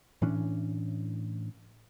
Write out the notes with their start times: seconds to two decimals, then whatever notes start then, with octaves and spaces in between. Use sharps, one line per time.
0.22 A2 E3 C#4 D4